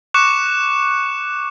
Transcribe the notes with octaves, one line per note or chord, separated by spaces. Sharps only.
C#6 D6 F#6 C#7 E7